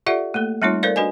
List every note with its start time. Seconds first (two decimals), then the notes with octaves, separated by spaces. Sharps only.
0.06 F4 G4 A4 D5 E5 F#5
0.34 A3 A#3 A4
0.62 G3 A3 C4 D#4 F4 C#5
0.83 A4 A#4 C5 D5 F5
0.96 D4 F#4 B4 D#5 G#5